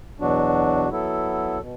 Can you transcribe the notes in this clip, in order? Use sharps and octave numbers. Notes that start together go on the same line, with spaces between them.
E2 B2 F#3 D4 F#4
F#3 B3 E4 A4
B2